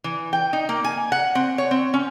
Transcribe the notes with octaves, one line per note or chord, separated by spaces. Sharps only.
E3
G5
D#4
A#3
G#5
F#5
C4
C#5
C4
C#4